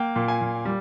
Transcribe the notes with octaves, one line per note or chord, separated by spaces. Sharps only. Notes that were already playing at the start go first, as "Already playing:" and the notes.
Already playing: A#3 G5
A#2
G#5
A#2
G3